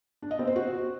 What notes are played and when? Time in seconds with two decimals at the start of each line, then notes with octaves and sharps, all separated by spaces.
0.22 D4
0.31 D#5
0.39 C4
0.47 C5
0.56 F#4